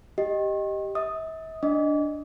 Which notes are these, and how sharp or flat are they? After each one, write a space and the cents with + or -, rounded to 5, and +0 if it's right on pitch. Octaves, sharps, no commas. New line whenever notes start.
G4 +0 D#5 +0
E5 -45 D#6 +0
D4 +0 D#5 +0 D6 -30